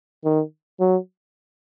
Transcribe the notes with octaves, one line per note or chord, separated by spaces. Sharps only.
D#3
F#3